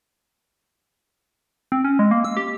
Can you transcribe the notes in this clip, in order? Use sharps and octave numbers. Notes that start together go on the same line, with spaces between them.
C4
C#4
G#3
A#3
E6
G4